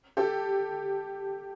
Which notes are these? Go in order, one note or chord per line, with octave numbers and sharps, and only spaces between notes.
G4 A4